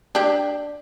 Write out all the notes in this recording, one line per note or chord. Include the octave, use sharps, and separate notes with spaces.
D4 G4